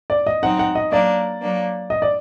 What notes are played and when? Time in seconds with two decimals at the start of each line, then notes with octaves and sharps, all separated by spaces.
0.10 D5
0.27 D#5
0.43 F#3 C4 D#4 F#5
0.59 F#5
0.75 D#5
0.92 F#3 A#3 D4 D5
1.42 F#3 A#3 D4
1.90 D#5
2.02 D5